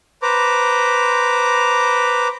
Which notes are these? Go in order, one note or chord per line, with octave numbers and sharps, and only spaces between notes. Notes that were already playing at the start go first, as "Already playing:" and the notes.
B4 C5 A#5 D6